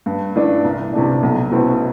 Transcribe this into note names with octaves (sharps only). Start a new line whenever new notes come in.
G2
E3 A3 D4
C2
C3 E3 A3 D4
B1
B2 A3 C4 E4